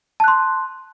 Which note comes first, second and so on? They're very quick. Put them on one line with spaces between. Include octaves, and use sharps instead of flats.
A5 F#6 C6